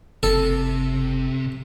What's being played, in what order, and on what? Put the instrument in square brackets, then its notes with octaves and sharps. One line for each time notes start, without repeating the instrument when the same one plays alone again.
[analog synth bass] F#1 [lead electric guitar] C3 [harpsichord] A4